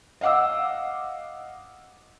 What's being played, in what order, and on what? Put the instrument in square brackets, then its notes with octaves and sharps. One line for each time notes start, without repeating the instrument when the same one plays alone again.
[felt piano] D#5 F5 F#5 D6 E6